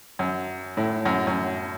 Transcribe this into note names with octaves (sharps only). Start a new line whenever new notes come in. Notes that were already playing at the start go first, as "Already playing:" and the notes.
F#2
A2
F#2
F#2